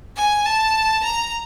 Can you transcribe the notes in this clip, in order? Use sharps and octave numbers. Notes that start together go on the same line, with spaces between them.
G#5
A5
A#5